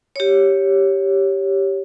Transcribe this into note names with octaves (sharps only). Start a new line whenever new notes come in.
G4 C#5